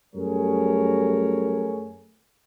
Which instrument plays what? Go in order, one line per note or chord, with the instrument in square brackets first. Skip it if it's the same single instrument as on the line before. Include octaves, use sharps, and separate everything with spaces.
[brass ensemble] F#2 G3 A3 G#4 A#4 C#5